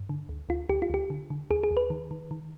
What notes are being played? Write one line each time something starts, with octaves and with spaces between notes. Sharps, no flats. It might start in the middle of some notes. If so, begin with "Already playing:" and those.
Already playing: G2
D3
D2
D2 F4
D2 G4
F4
D2 G4
D3
D3
D#2 G#4
G#4
D#2
B4
D#3
D#3
D#3